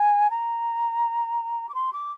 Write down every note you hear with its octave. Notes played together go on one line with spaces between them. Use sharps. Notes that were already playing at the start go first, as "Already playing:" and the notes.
Already playing: G#5
A#5
D6
C6
D6